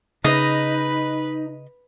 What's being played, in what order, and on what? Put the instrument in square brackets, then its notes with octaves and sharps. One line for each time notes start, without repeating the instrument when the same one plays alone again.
[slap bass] C#3 [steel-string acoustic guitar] D#4 [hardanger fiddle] B4 B5 [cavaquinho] D#5